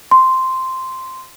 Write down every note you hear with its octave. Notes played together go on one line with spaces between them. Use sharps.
C6